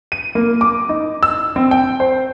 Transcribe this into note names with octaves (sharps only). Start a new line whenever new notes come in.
D#7
A#3
D6
D#4
E6
C4
G5
C5